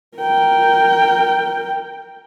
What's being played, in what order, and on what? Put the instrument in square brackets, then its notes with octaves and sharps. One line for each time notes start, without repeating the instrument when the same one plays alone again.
[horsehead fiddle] A#4 G5